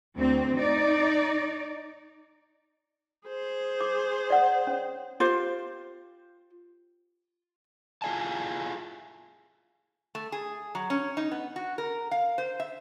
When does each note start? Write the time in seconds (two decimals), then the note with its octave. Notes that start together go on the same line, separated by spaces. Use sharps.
0.17 D2 C4
0.57 D#4 D5
3.28 G#4 C5
3.81 D6
4.30 D5 F#5 D#6
4.67 C#4 C#5
5.20 F4 G4 C5
8.02 E4 F4 G#4 D#5 G#5 A5
10.15 A3
10.32 G#4
10.75 F#3
10.90 C#4
11.17 D#4
11.31 B3
11.56 F#4
11.78 A#4
12.11 F5
12.38 C5
12.60 E5